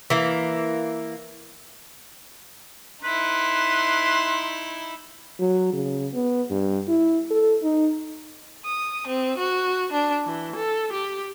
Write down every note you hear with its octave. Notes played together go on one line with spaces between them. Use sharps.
E3 A#3
D#4 E4 B4 C6
F#3
C#3
B3
G2
E4
A4
D#4
D#6
C4
F#4
D4
E3
A4
G4